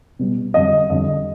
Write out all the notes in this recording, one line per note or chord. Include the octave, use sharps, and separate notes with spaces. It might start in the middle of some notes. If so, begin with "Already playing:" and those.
B2 G3
F2 D3 G3 D#5
F2 D3 G3 D#5